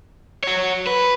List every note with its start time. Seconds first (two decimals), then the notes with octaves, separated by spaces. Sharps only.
0.44 F#4 C#5
0.87 B4